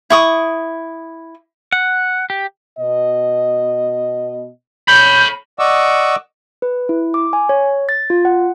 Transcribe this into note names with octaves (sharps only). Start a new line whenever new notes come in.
E4 C#6 D#6
F#5
G4
B2 D#5
C#5 B5 G6
D5 D#5 F#5 C#6 D6 E6
B4
E4
D6
G#5
C#5
A6
F4
F#5